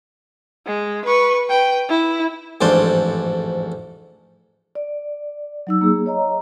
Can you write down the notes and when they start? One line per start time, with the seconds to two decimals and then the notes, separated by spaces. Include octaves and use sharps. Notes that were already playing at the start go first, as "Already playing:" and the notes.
0.67 G#3
1.05 B4 C#6
1.50 B4 G5
1.89 E4
2.61 A1 F2 G#2 D4 C5
4.75 D5
5.67 F#3 D#4 E6
5.81 A#3 G#4
6.06 C#5 D#5 A#5